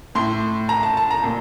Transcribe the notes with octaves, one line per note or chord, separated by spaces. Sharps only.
A2 C6
A#5
A5
A5
A#5
A#2